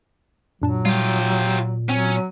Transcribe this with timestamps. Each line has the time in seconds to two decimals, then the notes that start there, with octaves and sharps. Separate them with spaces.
0.62 F#2 A#2 F#3 D4 A5
0.86 G3 F4 G4
1.89 F#3 C4 C#4 D#7